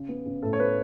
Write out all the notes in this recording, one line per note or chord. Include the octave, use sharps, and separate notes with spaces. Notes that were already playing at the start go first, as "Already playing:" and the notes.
Already playing: C#3
B3
C#3
A2 A4
C#5
B3 B4